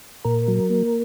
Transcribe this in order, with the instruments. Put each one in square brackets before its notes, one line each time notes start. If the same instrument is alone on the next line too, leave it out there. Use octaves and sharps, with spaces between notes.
[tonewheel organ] A#2 A#4
F#3
A#3